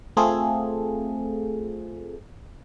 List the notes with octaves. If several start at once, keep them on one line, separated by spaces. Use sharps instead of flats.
A3 C4 F4 G#4 A4